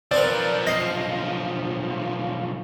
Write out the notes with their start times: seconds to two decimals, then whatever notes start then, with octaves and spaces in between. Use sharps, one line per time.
0.11 B1 F3 C4 A#4 B4 D5
0.67 D#5 A#6 C7